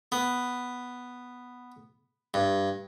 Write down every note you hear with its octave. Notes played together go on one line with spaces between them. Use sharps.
B3
G2